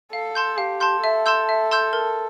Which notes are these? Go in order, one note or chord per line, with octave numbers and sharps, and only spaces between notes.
A4 F5
A5 C6 G6
G4 F5
A5 C6 G6
A4 E5
A5 C6 E6 G6
E5
A5 C6 E6 G6
A#4